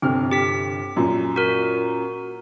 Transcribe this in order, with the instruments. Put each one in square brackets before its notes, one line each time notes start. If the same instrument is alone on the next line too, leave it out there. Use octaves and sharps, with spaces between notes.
[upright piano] G1 C3 F6 [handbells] C4
[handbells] G4 B6
[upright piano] F#2 A#2
[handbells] F#4 A#4